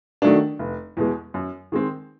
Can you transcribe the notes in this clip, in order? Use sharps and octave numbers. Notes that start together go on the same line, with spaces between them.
D#3 F#3 A3 D4
F1
E2 B2 G#3
F#2
D#3 G#3 C4